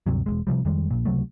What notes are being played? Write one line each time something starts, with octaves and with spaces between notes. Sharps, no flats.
D2 G2 C3 F#3
E1 C2 G#3
C3 D#3 F3 G3
F2 D#3 G3 G#3
A#1 F2 A#2
C#2 C3 F#3 A3